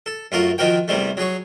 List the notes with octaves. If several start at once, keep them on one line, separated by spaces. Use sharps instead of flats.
A4
F#2 A3 F4 F#4 A#4
D#3 F3 F#4 A#4 G5
E2 C3 G3 A3
F#3 G#4 C#5